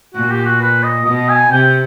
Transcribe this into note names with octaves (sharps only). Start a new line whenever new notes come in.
A#2 F#4
G4
F#4
B4
D#5
B2 D#5
G#5
C3 G5